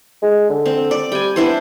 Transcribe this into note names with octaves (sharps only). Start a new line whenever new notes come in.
G#3
D3
C4
D5
G3 G5 G#5
B3 D4 E4 C5